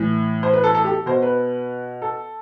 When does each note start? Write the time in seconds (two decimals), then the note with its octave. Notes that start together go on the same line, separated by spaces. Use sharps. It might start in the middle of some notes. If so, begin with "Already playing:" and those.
Already playing: A2 E3
0.43 C5
0.53 B4
0.64 A4
0.75 A4
0.84 G4
0.91 A4
1.06 B2 C5
1.22 B4
2.02 A4